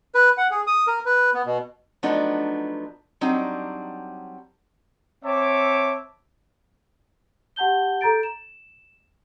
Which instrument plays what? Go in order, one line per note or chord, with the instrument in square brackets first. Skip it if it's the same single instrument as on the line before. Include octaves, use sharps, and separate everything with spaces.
[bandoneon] B4
F#5
G#4
D#6
A#4
B4
B3
B2
[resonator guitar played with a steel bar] F3 F#3 A3 B3 D4 D#4
F#3 G3 C4 D4 D#4
[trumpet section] C4 C#5 E5 A5 D6
[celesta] G4 F#5 A5 G6 G7
A4 A#5 G6 A6 D7
E7